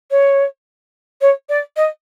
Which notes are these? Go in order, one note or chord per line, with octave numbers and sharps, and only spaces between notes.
C#5
C#5
D5
D#5